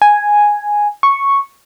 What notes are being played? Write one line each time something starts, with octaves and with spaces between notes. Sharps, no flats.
G#5
C#6